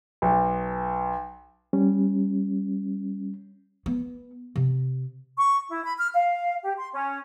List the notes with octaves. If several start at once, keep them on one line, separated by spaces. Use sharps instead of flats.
B1
G3 C#4
B3
C3
C#6
E4
B5
F6
F5
G4
C6
C#4